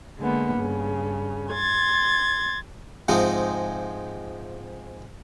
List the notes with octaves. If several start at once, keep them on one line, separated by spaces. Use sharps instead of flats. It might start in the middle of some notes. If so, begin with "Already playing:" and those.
D3 G#3 A#3 B3
G2 C#3
C6 G#6 A6
G#2 C3 F3 G#3 D#4